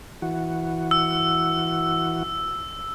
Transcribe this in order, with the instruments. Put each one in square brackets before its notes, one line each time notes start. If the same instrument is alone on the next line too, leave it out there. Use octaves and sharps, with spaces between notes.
[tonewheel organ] E3 F#4
[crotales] E6